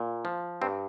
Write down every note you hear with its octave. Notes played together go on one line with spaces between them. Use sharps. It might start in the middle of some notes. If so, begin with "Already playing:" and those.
Already playing: A#2
F3
G2 C4